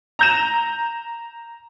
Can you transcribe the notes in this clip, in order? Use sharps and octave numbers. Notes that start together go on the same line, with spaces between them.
A#5 G6 E7